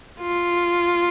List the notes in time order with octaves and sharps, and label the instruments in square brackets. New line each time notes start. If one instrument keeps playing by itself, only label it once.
[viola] F4